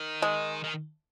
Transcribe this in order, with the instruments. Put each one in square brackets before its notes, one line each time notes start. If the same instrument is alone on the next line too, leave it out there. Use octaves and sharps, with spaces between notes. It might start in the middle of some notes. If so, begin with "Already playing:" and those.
Already playing: [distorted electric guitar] D#3
[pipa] G#3
[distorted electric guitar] D#3